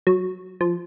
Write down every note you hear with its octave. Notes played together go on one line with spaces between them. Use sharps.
F#3
F3